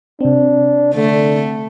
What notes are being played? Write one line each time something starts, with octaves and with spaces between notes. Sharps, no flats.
C3 C4 D4
D3 A3